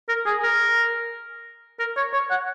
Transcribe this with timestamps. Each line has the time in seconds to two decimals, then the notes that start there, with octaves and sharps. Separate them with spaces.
0.09 A#4
0.26 G#4
0.43 A#4
1.79 A#4
1.97 C#5
2.13 C#5
2.31 F#5